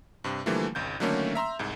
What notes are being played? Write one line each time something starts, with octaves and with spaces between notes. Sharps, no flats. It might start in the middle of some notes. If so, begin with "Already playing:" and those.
G2 C3
D3 E3 F3 G3 A3 A#3
G#1 C#2 G6
D3 D#3 F#3 A3 A#3 C#4
E5 A#5 C6 E6
C2 G#2